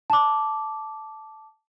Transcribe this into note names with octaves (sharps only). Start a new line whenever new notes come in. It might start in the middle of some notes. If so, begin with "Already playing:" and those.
A5 D6